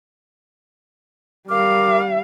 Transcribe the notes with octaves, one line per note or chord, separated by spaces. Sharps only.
G3 A#4 F5 D6 F6